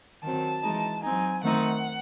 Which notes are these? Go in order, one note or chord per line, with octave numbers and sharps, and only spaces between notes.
D#3 F#3 C4 A5
E3 G#3 D#4
F#3 C4 D#4 G#5
D#3 A3 C4 D#4 F#5